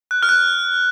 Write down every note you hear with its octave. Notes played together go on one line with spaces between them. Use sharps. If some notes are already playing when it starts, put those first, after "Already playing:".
F#6
F6
F#6